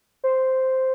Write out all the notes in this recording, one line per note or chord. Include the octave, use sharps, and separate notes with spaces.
C5